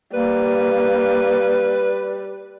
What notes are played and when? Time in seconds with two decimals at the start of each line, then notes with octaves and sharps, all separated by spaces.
0.14 G3 A#3 B4